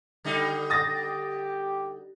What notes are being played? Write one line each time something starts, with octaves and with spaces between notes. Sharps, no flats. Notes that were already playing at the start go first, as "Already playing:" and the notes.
D3 G3 D#4
G4 D#6 A6 A#6